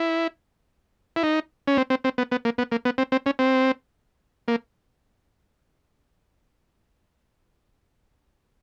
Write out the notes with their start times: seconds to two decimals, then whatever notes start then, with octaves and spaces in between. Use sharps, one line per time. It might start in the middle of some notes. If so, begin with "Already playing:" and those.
Already playing: E4
1.16 E4
1.23 D#4
1.68 C#4
1.77 C4
1.90 C4
2.04 C4
2.18 B3
2.32 B3
2.45 A#3
2.58 B3
2.72 A#3
2.85 B3
2.98 C4
3.12 C4
3.26 C#4
3.39 C4
4.48 A#3